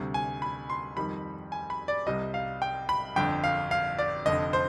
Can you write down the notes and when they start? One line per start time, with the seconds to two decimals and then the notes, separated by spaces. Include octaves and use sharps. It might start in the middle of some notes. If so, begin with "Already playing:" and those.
Already playing: D2 C3 G3
0.14 G#5
0.42 B5
0.70 C6
0.97 F2 D#3 G3 B5
1.52 G#5
1.70 B5
1.88 D5
2.07 C2 C3 G3 D#5
2.34 F5
2.62 G5
2.89 B5
3.16 G1 F2 D3 G5
3.44 F5
3.71 F5
3.98 D5
4.26 F1 F2 D3 D#5
4.53 C5